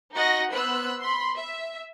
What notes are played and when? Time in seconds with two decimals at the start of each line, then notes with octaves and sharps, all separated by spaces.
0.13 D#4 F#4 D#5 F#5 A#6
0.53 B3 C5 B5 E6 F#6
1.00 B5 C6
1.37 E5